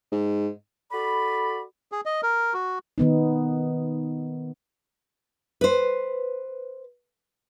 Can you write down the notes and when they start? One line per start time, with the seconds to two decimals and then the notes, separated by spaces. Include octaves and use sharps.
0.12 G#2
0.92 F#4 A4 D5 B5
1.92 G#4
2.05 D#5
2.23 A#4
2.54 F#4
2.98 D#3 B3 D#4
5.61 B4 C5